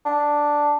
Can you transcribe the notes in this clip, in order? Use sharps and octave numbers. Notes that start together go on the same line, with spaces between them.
D4